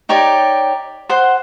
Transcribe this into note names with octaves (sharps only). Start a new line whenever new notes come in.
D#4 G4 C#5 D5
C5 F#5 C6